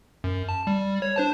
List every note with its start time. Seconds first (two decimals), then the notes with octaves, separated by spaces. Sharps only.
0.24 F#2
0.49 A5
0.67 G3
1.02 C#5
1.16 D4 C5 A5